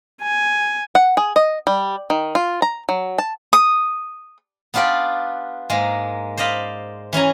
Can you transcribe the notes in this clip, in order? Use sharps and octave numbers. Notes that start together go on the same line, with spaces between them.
G#5
F#5
G#4
D#5
G3
D#3
F4
A#5
F#3
A5
D#6
B3 D4 F4 G4 D5
G#2 G#3 A#3
C5 D5 D#5 F5 B5
E3 C#4 G#5 A#5